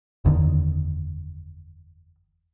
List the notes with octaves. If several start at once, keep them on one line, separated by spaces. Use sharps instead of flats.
F#1 E2 D3 D#3